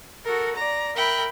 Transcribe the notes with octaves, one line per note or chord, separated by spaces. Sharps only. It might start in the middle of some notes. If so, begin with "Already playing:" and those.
F#4 A4 A#4
D5 A#5
A#4 E5 G5 B5 F#6